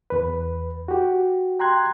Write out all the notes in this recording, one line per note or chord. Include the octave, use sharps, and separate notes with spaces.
E2 B4
F#4 G4
G5 A#5 C6 F#6 G#6